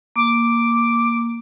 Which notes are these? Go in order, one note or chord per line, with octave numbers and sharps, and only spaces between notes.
A#3 D6